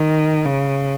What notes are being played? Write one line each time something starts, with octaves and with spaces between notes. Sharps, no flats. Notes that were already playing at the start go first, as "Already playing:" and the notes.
Already playing: D#3
C#3